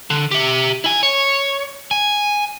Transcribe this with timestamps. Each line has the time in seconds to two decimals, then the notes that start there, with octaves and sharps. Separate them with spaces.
0.10 D3
0.31 G4 E5
0.84 E4 G#5
1.03 C#5
1.91 G#5